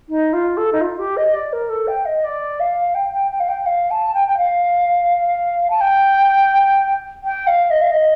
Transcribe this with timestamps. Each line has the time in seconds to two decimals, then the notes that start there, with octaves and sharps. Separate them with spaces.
0.09 D#4
0.33 F4
0.57 A4
0.72 D#4
0.80 F4
0.99 G4
1.17 D#5
1.33 D5
1.52 A#4
1.69 A4
1.87 G5
2.05 D#5
2.24 D5
2.60 F5
2.94 G5
3.13 G5
3.31 G5
3.40 F5
3.48 G5
3.61 G5
3.66 F5
3.90 A5
4.14 G5
4.28 G5
4.37 F5
5.70 A5
5.80 G5
7.23 G5
7.47 F5
7.70 D#5
7.81 F5
7.91 D#5